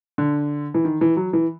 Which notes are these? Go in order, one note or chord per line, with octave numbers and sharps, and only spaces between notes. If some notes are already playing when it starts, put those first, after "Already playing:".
D3
E3
D#3
E3
F#3
E3